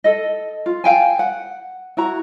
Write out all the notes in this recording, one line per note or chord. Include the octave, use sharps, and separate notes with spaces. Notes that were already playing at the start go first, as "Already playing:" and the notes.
A4 D#5
F4
F5 G5 G#5
F#5
E4 F#4 A#5